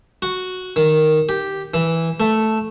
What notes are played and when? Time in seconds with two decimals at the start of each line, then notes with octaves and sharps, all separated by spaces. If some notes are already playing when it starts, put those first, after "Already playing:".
0.22 F#4
0.76 D#3
1.29 G4
1.74 E3
2.20 A3